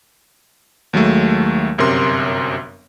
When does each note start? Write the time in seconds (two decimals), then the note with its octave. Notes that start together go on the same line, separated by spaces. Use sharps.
0.93 D#2 F#3 G#3 A3
1.78 G1 F#2 C3 A#4 C6